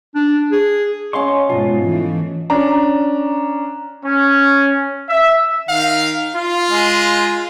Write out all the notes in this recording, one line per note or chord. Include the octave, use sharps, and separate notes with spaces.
D4
G#4
C#4 D#5 F5 C6 C#6
G#2 B2 F4 A5
E3 A3
C#4 D4 A#5
C#4
E5
D#3 F5
F4 F5
G#3 G#4